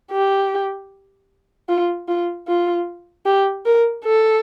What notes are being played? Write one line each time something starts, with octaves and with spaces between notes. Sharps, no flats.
G4
F4
F4
F4
G4
A#4
A4